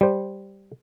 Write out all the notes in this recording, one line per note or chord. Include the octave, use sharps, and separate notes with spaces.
G3 C5